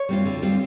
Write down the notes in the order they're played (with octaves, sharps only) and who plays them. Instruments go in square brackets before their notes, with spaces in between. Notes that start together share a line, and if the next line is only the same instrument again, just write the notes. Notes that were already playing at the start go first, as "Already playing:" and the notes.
Already playing: [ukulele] C#5
[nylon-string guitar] G3 C4 F4
D3
G3 C4 F4